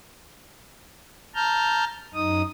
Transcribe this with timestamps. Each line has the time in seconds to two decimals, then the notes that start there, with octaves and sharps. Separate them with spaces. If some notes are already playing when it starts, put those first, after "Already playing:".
1.35 A5 A#5 F6 G6
2.14 F#2 D#4 D#6